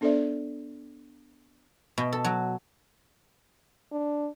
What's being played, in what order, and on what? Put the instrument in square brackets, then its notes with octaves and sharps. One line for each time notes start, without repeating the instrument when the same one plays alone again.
[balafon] B3 D4 A4 C5 D5 E5
[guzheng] B2
A4
F#3
[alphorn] D4